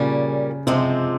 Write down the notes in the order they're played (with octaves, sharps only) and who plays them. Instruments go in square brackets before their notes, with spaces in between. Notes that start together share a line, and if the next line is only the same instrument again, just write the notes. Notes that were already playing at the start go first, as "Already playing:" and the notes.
Already playing: [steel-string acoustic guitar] A#2 G3 C#4 [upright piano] C#3
[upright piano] C3 [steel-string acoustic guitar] F3 G#3 C4